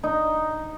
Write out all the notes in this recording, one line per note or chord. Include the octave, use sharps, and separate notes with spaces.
D#4